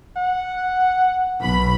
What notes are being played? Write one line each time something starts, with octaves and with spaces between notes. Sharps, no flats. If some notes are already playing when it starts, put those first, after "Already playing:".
F#5
B1 B5